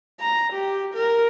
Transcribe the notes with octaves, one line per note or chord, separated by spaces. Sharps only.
A#5
G4
A#4